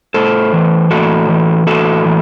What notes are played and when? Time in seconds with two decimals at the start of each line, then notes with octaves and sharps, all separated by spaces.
0.14 A2 A4 C5
0.53 E3
0.91 A2 F#4 A4
1.29 E3
1.67 A2 F#4 A4
2.05 E3